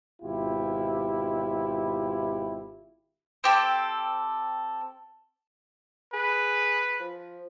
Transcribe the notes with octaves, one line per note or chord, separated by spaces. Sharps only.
G#1 B2 E4 F4 G4
C4 G4 A4
G#4 B4
F3